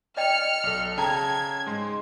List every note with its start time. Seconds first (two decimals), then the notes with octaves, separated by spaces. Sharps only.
0.17 D5 D#5 G5 F6 C#7
0.63 B1 A4
0.98 C#3 G5 A5 A#5 G#6
1.66 G#2 G#3 C6